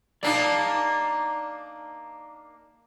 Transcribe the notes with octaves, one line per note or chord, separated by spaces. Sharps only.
A#3 D4 D#4 D5 F5 A5